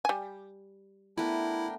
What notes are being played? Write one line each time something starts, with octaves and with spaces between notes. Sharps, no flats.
G3 G#5
A3 B3 D4 E4 A#4 G5